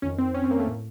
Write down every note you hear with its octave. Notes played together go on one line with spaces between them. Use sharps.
F2 D#3 C#4
C4
C#4
C4
A#3
A3
A2 A#3